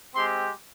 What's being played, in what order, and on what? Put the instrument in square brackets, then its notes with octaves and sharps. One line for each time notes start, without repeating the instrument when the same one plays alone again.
[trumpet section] G#3 C4 G4 C6